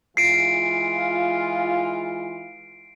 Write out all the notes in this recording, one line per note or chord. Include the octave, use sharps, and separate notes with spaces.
E3 G#3 F4 C7 D7